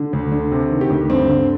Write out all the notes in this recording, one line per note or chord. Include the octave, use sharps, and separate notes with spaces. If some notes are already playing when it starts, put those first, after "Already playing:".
Already playing: D3
D2
D3
C3
D#3
G4
D2
G2 C4
D3